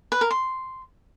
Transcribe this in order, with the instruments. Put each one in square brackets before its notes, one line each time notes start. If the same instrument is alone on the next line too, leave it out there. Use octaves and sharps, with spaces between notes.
[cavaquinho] B4
A#4
C6